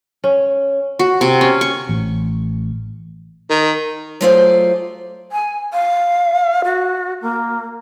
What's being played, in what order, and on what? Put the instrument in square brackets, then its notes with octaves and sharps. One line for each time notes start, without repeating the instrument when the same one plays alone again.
[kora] C#4
[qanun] F#4
C3
C#4
C#6
[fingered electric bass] A1
[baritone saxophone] D#3
[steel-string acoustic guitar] F#3 A3 F4 G#4 C5 D5
[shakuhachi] G#5
F5
F#4
A#3